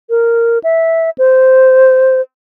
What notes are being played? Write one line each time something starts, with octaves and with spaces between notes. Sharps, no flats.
A#4
E5
C5